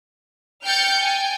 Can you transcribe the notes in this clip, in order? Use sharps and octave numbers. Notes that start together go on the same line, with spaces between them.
G5 F6 G6 A6 C#7
G5 G#5